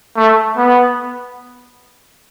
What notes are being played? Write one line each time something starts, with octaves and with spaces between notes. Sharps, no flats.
A3
B3